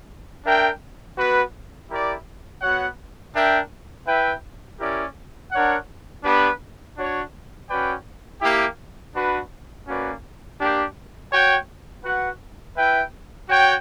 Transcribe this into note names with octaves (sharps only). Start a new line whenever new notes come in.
D4 A#4 E5 G5
B3 F#4 B4
E4 G4 A#4 D5
B3 F#4 C#5 F#5
D4 A#4 E5 G5
E4 B4 E5 G5
C#4 E4 G4 A#4 D5
D4 A#4 C#5 F#5
B3 D4 G4 B4
D4 F#4 C#5
C#4 F#4 B4 D5 G5
A#3 E4 G4
D4 F#4 B4
A#3 C#4 F#4 B4 D5
A#3 D4 G4
F#4 C#5 G5
F#4 B4 F#5
E4 B4 E5 G5
F#4 C#5 G5